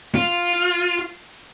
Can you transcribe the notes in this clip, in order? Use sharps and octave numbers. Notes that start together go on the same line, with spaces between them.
F4